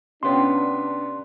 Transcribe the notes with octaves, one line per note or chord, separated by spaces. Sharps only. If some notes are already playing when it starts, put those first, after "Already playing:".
C3 B3 C#4 D4 F4 C#5 G5 C6